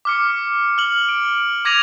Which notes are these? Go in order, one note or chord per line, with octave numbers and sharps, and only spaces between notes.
D6 F6 C#7
F6 F#7
D7
D6 G#6 A#6 D#7 F7 F#7